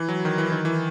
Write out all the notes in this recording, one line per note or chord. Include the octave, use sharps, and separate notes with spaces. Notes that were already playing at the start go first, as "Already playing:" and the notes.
Already playing: E3
F#3
D#3
E3
D#3
E3